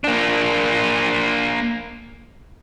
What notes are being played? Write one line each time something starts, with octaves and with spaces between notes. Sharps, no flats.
A#3 D4